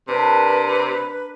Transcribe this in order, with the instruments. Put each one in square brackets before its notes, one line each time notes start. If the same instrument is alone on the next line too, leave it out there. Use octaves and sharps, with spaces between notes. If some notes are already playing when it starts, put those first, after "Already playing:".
[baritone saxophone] C3 [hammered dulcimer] D4 A#4 [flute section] B4